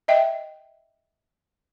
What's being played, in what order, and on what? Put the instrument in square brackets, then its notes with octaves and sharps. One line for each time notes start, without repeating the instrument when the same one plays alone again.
[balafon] D#5 E5 G5